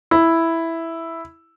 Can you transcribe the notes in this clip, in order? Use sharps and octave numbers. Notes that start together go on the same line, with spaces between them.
E4